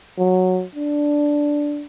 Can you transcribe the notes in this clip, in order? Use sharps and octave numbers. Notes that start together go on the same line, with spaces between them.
F#3
D4